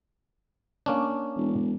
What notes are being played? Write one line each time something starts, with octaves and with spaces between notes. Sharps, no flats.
A#3 C#4 D4
E1